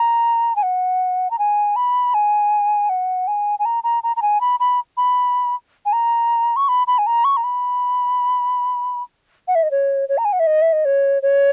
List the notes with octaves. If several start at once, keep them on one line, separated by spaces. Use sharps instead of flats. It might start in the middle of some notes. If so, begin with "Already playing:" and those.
Already playing: A#5
G#5
F#5
A#5
G#5
B5
G#5
F#5
G#5
G#5
A#5
A#5
A#5
A#5
G#5
B5
B5
B5
G#5
A#5
C#6
B5
B5
G#5
A#5
C#6
A#5
B5
F#5
E5
D#5
C#5
C#5
A#5
G#5
F#5
E5
D#5
E5
D#5
C#5
C#5